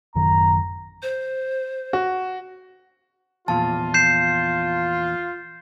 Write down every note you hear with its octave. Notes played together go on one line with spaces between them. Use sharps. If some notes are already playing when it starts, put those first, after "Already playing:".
A1 F#2 D#3 A#5
C5
F#4
E2 A#2 F3 F4 A5
G6 C7 E7